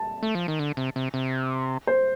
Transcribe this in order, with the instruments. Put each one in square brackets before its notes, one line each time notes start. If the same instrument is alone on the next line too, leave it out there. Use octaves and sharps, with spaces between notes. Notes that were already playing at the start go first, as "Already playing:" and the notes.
Already playing: [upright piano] A5
[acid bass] A3
F3
D#3
D3
C3
C3
C3
[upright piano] C5